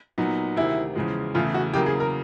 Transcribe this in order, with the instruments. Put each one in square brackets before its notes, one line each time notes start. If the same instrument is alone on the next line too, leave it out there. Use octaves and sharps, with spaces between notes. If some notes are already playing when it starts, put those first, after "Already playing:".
[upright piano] A#2 F#3 B3 D#4
[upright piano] D2 C3 D#3 [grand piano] E4
[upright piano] E2 C#3 F3 G#3
[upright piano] E2 C#3 E3 A3 [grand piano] F4
[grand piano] F#4
[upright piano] E2 C#3 F#3 A#3 [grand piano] G4
[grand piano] G#4
A#4